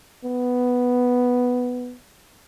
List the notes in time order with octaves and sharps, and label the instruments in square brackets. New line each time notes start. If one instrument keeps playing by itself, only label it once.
[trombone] B3